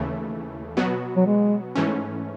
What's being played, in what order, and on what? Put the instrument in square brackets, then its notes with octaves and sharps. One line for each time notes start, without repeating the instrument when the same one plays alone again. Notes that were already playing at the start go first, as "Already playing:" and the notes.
Already playing: [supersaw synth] D#2 C#3 E3 A3
B2 F#3 B3 F#4
[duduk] F#3
G#3
[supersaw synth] G#2 E3 A3 C#4